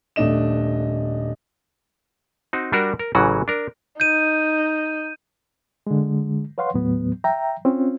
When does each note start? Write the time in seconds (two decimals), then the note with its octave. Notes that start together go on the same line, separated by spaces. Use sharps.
0.16 D#1 A3 D4 D#5 E7
2.53 C4 D#4 F#4
2.72 G3 D4 F#4 A#4
2.99 A#4
3.15 A1 C#3 E3 F#3 F#4
3.48 D4 A#4
4.00 D#4 G6 D#7
5.87 D3 G#3
6.58 B4 C#5 F5 F#5 C6
6.74 D#2 A2 F#3 B3
7.24 E5 G5 A#5
7.65 C4 C#4 F4